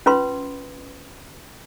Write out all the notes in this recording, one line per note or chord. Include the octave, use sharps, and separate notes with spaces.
C#4 F4 B4 B5 C6